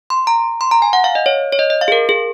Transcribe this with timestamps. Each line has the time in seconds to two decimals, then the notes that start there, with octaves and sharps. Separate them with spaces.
0.10 C6
0.27 A#5
0.61 C6
0.71 A#5
0.82 G#5
0.93 F#5
1.04 F5
1.15 D#5
1.26 C#5
1.52 C#5
1.59 D#5
1.70 D#5
1.81 F5
1.88 G#4
1.92 A#4
2.09 G#4